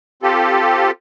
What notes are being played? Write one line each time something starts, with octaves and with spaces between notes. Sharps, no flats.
C4 F4 G4 A4